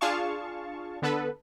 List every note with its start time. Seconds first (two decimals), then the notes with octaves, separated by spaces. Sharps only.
0.01 D4 F4 G#4 F5 A5 C#6
1.02 D3 B3 A4 B4